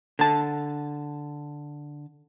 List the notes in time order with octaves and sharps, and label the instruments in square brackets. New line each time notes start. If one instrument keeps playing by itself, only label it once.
[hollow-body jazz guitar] D3 A5